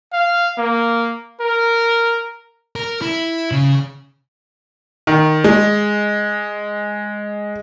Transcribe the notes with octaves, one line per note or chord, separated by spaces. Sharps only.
F5
A#3
A#4
A#4
E4
C#3
D#3
G#3